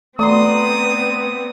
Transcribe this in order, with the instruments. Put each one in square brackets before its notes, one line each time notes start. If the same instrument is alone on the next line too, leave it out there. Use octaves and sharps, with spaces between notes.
[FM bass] A3 [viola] B3 C4 [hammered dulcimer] D5 A#5 C6 [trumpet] D#6